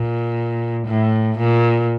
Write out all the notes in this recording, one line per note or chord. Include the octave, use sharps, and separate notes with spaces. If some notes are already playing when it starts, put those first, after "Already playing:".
Already playing: A#2
A2
A#2